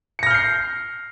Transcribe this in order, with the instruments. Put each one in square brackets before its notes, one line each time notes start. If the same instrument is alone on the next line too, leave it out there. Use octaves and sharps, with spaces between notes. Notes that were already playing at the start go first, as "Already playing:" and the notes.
[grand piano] C#7
A#6
F6
G6
C7